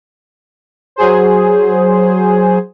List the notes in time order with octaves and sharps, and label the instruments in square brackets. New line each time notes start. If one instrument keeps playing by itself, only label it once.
[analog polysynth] F#3 G#4 C5